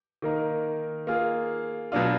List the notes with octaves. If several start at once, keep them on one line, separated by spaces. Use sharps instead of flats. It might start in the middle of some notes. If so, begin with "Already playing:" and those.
D#3 A#3 D#4 A#4
A#3 F4 G#4
B2 F#3 D4 F4